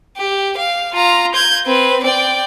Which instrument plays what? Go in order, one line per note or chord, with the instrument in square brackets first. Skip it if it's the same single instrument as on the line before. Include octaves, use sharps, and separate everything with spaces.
[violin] G4
F5
F4 A#5
G6 G#6
C4 B4
D5 G5